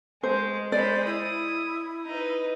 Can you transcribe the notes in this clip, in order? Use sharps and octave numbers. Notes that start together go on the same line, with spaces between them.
G#3 C5
G#3 C5 D5 B5
E4 D#6
D#4 B4